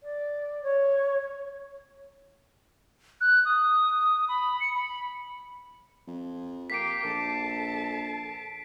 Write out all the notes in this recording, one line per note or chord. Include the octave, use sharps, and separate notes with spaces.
D5
C#5
F#6
D#6
B5
C#7
B5
F2
A#3 G4 B6 C7 D7
A#1 A4 A5